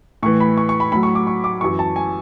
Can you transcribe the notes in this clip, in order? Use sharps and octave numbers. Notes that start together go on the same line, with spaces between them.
A2 E3 C#6
B5
C#6
C#6
B5
A2 F#3 B5
C#6
D6
C#6
D6
F#2 E3 C#6
A5
G#5